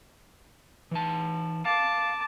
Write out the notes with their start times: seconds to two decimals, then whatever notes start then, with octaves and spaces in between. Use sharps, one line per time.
0.91 E3 D#4 A5
1.65 F5 A5 D6